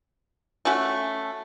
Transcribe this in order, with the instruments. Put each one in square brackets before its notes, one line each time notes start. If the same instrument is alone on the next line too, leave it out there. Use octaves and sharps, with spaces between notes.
[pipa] A3 C#4 F#4 A4